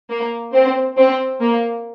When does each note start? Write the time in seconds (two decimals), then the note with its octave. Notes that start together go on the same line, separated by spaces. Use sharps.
0.10 A#3
0.53 C4
0.97 C4
1.40 A#3